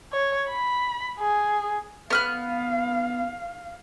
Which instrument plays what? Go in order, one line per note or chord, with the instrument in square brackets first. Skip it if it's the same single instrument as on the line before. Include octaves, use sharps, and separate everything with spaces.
[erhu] C#5
B5
G#4
[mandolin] B3 F6 F#6 [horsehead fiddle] F5